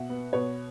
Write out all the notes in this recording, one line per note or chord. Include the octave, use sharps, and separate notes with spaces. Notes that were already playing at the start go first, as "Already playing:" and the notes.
Already playing: B2 E5 F#5
B3
B2 B4 C#5